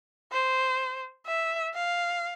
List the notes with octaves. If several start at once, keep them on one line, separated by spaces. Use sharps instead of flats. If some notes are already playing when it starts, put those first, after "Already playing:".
C5
E5
F5